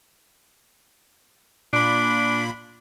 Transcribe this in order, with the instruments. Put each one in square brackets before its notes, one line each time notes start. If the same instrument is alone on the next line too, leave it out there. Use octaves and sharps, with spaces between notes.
[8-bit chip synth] A#2 B5 [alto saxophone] D4